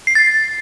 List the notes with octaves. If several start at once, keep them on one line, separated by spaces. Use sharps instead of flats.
C7
A6